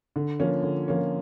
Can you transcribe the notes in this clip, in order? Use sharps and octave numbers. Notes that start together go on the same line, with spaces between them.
D3
F3 A#3 C#4
D3
F3 A#3 C#4